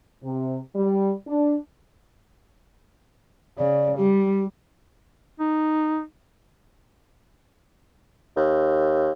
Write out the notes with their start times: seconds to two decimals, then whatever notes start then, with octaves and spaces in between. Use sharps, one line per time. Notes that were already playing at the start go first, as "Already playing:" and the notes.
0.23 C3
0.75 G3
1.27 D4
3.58 C#3 D5
3.97 G3 G4
5.40 D#4
8.37 D#2